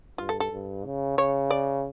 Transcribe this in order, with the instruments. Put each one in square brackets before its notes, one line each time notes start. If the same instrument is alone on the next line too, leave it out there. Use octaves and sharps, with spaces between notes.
[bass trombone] G2 [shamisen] F4
[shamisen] A4
A4
[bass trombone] G2
C#3
[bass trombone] C#3 [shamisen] C#5
[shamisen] D5